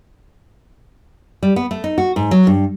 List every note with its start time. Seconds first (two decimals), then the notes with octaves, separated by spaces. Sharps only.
1.43 G3
1.56 B3
1.71 A3
1.84 D#4
1.98 F#4
2.16 G#2
2.31 F#3
2.47 G2